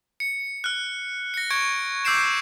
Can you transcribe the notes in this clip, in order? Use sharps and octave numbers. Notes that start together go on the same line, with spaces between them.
C#7
F6 F#6
A#6 C#7
C#6 G#6 D7
D6 E6 G6 C7 D7 E7